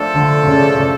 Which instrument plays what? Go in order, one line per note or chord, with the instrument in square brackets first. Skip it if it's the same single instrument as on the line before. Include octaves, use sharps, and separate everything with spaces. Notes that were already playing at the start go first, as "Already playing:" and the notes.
Already playing: [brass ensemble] F3 A3 D4 A4
[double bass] D3
C#3